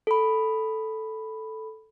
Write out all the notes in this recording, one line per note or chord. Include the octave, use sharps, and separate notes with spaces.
A4 B5